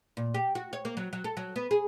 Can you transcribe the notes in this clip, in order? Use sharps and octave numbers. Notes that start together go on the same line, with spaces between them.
A#2
G4
F#4
C#5
A#3
F#3
F#3
A4
F#3
B3
G#4